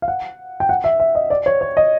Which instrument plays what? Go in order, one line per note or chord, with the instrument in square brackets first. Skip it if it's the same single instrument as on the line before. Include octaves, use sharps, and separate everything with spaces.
[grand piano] F5
F#5
G5
F#5
E5
E5
D#5
D5
C#5
C#5
D#5